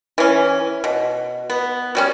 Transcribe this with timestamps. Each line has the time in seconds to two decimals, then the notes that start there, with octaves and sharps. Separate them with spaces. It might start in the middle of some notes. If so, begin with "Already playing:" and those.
0.18 E3 C#4
0.84 B2
1.50 B3
1.95 F#3 G3 C#4